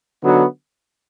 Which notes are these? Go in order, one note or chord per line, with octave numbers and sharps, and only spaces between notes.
D3 F#3 B3 D#4 F#4